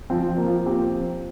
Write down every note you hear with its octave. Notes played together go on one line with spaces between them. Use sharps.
F3 C4
F3
A#3
F3
C4 G4